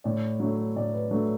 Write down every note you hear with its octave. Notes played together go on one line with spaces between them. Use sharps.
A2 D5
F#3 A3
A2 D5
B4
F#3 A3 A4